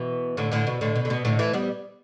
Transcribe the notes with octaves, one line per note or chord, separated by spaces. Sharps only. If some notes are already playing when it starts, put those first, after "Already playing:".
Already playing: B2 E3
A2 D3
A2 D3
B2
A2 D3
B2
D3
B2
A2 D3
E3 A3
G3 B3